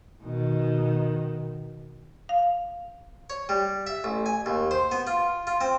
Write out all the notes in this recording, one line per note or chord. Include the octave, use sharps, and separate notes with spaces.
B2 D#3
F5
C#5
G3
E5
A1
G#5
D#2
C5
B3
F4
F4
C4